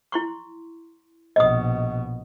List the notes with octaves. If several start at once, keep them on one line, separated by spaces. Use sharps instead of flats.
E4 C6 C#6
A#1 B2 D#5 D#6